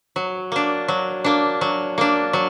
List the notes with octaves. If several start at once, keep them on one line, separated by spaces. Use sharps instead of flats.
F#3
A#3 D4
F#3
A#3 D4
F#3
A#3 D4
F#3